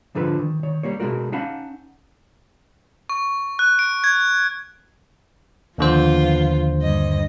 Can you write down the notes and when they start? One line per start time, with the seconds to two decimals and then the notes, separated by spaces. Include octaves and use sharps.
0.15 G#2 D3 F3 A4 B4 B5
0.39 D#3
0.63 D#3 C#5
0.83 G3 A#3 C#5
1.00 B2 G#3 A3 F#4 A#4
1.32 C#4 D#4 F5 F#5 A5 B5
3.09 C#6
3.59 F#6
3.79 D7
4.04 G#6
5.78 D#2 D3 F3 B3 F4 C5
6.82 G2 D#5